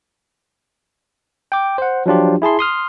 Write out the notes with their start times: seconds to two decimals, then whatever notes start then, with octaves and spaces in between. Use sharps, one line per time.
1.52 G5 D6
1.78 C5 F#5
2.06 F3 F#3 D4 F4 G4
2.42 E4 G#4 A5 C6
2.59 C6 D#6 F6